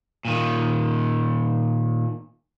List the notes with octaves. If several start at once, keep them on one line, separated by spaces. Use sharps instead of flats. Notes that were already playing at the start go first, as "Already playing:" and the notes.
A#2 D#3